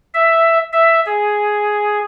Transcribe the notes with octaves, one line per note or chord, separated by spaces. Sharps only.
E5
E5
G#4